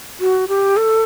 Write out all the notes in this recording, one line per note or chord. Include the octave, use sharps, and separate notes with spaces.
F#4
G4
A4